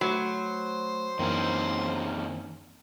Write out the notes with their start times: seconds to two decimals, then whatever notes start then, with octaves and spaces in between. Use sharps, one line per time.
0.01 F#3 A3 C5 B5
1.19 F#2 D#3 E3 A#3 C4 C#4